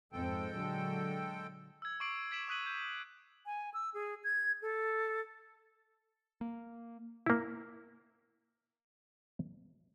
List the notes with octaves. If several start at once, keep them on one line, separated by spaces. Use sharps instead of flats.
F2 G#2 G#3 C4 A4 G5
A#2 D3 F#3
E6 G#6
C#6 D6 C7 D7 F#7
G#6 B6 D7 E7 F#7
D6 D#6 F#6 B6 D#7 F#7
G6
G#5
E6
G#4
G#6
A4
A#3
A#3 E4